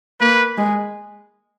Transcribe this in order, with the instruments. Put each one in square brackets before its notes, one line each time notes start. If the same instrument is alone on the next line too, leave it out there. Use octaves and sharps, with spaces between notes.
[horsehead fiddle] A#3 [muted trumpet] B4
[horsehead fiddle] G#3